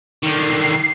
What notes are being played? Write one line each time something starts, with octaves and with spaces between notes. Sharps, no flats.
D3 D#3 C7